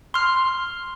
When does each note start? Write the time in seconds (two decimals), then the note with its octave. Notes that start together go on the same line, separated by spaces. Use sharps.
0.14 C6 F6